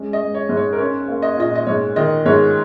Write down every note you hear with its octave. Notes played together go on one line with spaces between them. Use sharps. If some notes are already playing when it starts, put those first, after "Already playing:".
Already playing: G#3 C#4
D#5
G#3
C#5
G#2
C#5
A#4
C#4 C#5
A#3
D#5
A#2 D#5
D#5
G#2 C#5
D#3 D#5
G#2 C#5